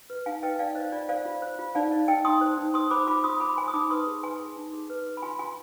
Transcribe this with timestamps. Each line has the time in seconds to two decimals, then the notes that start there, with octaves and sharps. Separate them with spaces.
0.10 B4
0.26 D#4 F5 G#5
0.43 B4 D#5 G5
0.59 D#4 D5 F5
0.75 C5 D#5
0.92 F4 D5
1.09 C5 D5 F5
1.25 F4
1.42 C5
1.59 F4
1.75 D#4 D5 F5
1.91 D#4 D#5
2.08 D#4 D#5 G5
2.25 D#4 C6 D#6
2.41 C5
2.58 D#4
2.74 C5 C6 D#6
2.91 C5 B5 D6
3.07 F4 B5 D6
3.24 F4 C6 D#6
3.40 F4 B5 D6
3.57 C5 G#5 C6
3.68 D#6
3.74 D#4 B5 D6
3.90 B4 C6 D#6
4.07 G#4
4.23 B4 G#5 C6
4.40 G#4
4.56 D#4
4.73 G#4
4.90 B4
5.07 B4
5.17 B5
5.22 F4 G#5 C6
5.39 F4 G#5 C6